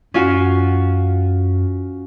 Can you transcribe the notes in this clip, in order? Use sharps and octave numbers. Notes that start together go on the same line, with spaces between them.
F#2 C#4 F4 F#4